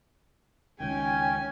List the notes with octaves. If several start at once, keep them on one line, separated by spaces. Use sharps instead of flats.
C#2 D#3 C#4 G5 G#5